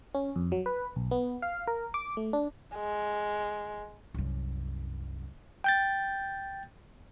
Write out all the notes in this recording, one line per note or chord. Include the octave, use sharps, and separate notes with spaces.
C#4
F2
F#3
B4
B1
B3
F5
A#4
D6
A3
D4
G#3
C2 F#2
G5 G6 A6